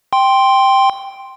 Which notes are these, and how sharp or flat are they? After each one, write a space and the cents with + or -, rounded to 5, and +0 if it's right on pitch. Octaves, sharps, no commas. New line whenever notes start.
G5 +0 C6 +0